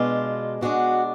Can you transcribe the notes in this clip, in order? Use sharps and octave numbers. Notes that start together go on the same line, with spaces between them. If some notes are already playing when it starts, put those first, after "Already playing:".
Already playing: B2 G#3 D4 F4
B2 G#3 D4 F#4